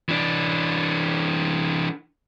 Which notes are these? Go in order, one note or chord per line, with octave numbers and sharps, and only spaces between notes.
E3 D4